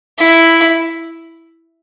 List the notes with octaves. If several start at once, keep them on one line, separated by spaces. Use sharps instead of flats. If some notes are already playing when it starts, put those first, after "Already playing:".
E4